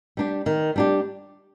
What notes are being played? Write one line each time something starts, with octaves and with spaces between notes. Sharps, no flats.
G3 D4 G4
D#3
G3 D4 G4